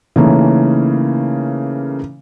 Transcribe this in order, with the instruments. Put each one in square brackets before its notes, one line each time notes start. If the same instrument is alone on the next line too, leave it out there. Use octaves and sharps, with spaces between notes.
[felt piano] C#3 E3 A3 A#3 C#4 D#4